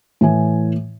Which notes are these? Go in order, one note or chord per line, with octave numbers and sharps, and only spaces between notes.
A2 E3 G#5